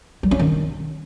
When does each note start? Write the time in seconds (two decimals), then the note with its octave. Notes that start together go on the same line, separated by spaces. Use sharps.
0.23 G3
0.31 C#4
0.39 D#3